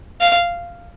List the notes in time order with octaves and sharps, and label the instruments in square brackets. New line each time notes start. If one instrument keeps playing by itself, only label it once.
[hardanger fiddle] F5